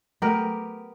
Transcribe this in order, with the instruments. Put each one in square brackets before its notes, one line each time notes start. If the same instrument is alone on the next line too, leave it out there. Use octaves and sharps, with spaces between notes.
[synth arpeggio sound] F#3 A3 A4 [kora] B3 G4 A#4